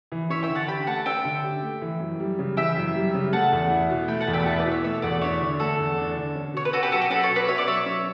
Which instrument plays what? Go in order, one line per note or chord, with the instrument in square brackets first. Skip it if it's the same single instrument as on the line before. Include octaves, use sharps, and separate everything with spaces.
[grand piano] E3
[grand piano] C#4 [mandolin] C#5 E5
[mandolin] E5 G5
[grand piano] D3
[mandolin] F#5 A5
[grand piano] G4 [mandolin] G5 B5
[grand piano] A3 [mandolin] F#5 A5
[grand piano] C#4 [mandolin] E5 G5
[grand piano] D3
G4
A3
E3
F#2
G3
C#3
[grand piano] E3 [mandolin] E5 G5
[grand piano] F#2
G3
C#3
[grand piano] A3 [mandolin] F#5 A5
[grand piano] E2
E4
B2
[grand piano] A3 [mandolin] G5 B5
[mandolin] F#5 A5
[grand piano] E2
[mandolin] E5 G5
B5
[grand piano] E4 [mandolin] F#5 A5
[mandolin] B4 D5
[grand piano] B2
[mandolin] C#5 E5
[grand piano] A3 [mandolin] C#5 E5
[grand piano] E2 [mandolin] D5 F#5
[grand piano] D4 [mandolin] C#5 E5
[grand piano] D3
[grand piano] A3 [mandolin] F#4 A4
[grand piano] E2
D4
D3
C#4
[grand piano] B2 [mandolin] C#5
[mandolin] B4
[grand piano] B2 [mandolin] F#4 A4
[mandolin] G4 B4
[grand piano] F#3 [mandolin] F#4 A4
[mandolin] G4
[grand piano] C#4 [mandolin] F#4 A4
[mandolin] A4 C#5
[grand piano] B2
[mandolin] B4 D5
[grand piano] B2 [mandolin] C#5 E5
[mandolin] D5
[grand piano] F#3 [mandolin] C#5 E5
[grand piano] C#4